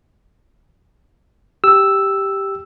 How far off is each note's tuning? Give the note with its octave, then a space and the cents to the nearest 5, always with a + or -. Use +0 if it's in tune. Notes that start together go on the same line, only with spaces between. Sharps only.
G4 +0 E6 +0